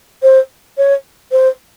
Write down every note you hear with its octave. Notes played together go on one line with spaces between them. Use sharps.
C5
C#5
C5